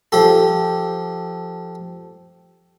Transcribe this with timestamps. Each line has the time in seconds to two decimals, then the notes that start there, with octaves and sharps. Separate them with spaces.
0.12 F3 G4 A4